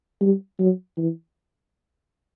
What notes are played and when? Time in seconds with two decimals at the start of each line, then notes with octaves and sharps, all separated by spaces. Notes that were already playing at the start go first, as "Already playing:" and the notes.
0.21 G3
0.60 F#3
0.98 E3